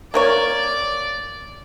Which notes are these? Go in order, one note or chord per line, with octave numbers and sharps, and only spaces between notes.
A#3 A#4 C#5 D5